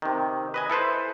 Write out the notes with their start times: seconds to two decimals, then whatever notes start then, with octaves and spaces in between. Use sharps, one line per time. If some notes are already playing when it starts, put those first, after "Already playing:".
0.02 C3 D#3
0.54 B4 D#5 G#5
0.70 E4 A4 B4 C5